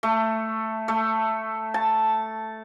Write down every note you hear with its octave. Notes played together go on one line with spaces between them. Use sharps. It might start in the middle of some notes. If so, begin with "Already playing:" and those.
A3
A3
A5